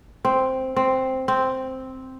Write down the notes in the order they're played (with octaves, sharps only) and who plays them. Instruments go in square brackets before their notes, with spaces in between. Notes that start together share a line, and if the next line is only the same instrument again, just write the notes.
[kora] C4
C4
C4